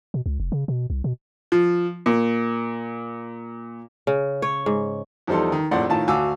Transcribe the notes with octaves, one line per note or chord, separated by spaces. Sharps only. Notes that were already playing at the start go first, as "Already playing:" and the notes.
B2
C#2
F1
C#3
B2
C2
B2
F3
A#2
C#3
C#5
G#2
E2 F3 G3 D#4 A4 C6
D#3
A#1 F2 A2 D5 F#5 C6
A2 D#3 F4 A5
D2 F#4 F5 G#5 D6 E6